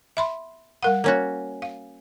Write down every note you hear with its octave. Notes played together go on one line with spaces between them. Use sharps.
E5 B5 C6
G3 A#4 F#5
A#3 C#4 F#4
F5